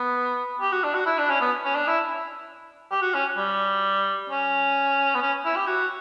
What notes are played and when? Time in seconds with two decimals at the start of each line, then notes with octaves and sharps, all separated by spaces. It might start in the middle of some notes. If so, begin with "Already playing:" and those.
Already playing: B3
0.61 G4
0.72 F#4
0.84 D4
0.95 F#4
1.06 E4
1.18 D4
1.30 C#4
1.41 B3
1.65 C#4
1.75 D4
1.88 E4
2.91 G4
3.02 F#4
3.14 C#4
3.37 G3
4.30 C#4
5.14 B3
5.22 C#4
5.45 E4
5.56 G4
5.67 F#4